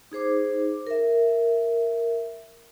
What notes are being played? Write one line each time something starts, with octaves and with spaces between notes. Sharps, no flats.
D#4 G#4 C5 D6
A#4 E5